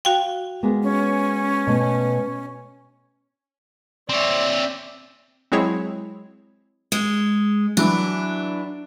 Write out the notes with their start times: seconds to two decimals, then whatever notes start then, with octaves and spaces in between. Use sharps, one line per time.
0.05 F#4 F5 G5
0.63 G#3 A#3 B3
0.83 C#4
1.67 B2 A3
4.09 C4 C#5 D5 E5
5.52 F#3 G#3 C4 E4 G#4 C#5
6.92 G#3
7.77 E3 F#3 D4 E4